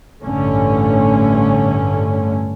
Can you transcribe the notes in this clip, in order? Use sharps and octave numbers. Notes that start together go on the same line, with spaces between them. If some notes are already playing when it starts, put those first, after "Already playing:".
A1 G2 D3 A3 C#4